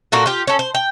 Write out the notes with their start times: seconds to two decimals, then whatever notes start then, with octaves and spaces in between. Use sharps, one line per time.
0.12 A#2 A#3 F#4 A4
0.26 F4 G4
0.47 C#4 A4
0.59 C5
0.75 G5